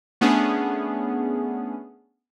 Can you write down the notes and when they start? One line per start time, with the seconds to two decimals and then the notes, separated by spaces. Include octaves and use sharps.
0.21 A3 B3 C#4 D4 G#4